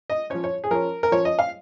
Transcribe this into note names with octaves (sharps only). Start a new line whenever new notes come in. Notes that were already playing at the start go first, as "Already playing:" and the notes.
D#5
F3 C#4 C#5
C#5
G#4
F3 C#4 A#4
A#4
F3 C#4 C#5
D#5
F5